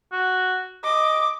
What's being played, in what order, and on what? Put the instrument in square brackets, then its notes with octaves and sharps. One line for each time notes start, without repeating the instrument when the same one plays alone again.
[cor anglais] F#4
[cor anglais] D#5 [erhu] D6